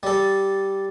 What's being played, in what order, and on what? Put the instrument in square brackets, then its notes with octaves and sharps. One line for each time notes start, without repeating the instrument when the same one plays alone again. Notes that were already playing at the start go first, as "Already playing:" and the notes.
[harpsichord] G3 A4